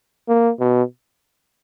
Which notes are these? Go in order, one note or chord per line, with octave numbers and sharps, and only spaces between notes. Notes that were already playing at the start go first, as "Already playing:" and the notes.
A#3
B2